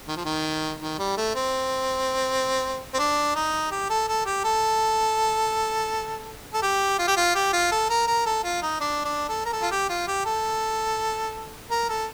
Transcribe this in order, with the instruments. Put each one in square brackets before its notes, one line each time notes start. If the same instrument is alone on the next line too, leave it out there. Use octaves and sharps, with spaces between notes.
[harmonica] D#3
F3
D#3
D#3
G3
A3
C4
C4
D4
D#4
G4
A4
A4
G4
A4
A4
G4
F4
G4
F4
G4
F4
A4
A#4
A#4
A4
F4
D#4
D4
D4
A4
A#4
A4
F4
G4
F4
G4
A4
A#4
A4